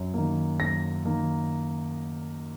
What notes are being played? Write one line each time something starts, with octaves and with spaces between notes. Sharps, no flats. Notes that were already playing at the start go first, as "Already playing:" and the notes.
Already playing: F#2
D#3 A#3
F#2 A#6
D#3 A#3